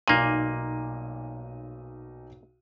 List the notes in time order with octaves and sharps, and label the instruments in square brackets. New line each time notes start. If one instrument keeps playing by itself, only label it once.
[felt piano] B1 D#4 D#7 [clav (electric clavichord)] A#2 A#3